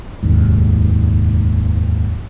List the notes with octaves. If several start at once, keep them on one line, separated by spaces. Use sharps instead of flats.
F1 D#2 G#2